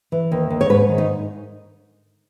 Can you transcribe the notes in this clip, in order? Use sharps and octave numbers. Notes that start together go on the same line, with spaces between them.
E3
D#2
D#2
C#5
G#2 B4
D#3
D#4